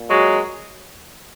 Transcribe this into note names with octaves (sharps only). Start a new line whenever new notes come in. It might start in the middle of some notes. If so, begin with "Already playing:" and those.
Already playing: A#2
F#3 G#3